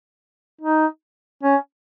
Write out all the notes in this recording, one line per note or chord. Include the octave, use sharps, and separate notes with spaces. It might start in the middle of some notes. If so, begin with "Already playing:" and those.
D#4
C#4